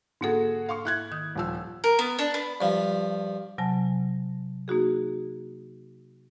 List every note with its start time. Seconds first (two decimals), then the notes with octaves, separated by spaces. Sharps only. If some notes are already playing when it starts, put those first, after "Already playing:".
0.21 G#2 D3 A#3 F#4 G#4 A4
0.69 F5 C6 C#6
0.85 E4 F#6 G#6
1.12 D#3 D#6 G6
1.36 D#1 F3 E6
1.84 A#4
1.99 B3
2.19 D4
2.34 B3
2.61 G2 F3
3.58 C3 F#3 G#5 A5
4.68 A#3 D#4 F#4 G#4